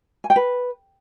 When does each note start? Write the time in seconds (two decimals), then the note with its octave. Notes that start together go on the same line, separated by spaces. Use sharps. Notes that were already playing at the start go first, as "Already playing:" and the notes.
0.24 G#5
0.30 G5
0.36 B4